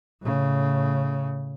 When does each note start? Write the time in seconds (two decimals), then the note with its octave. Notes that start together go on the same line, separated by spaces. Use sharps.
0.22 A2 C#3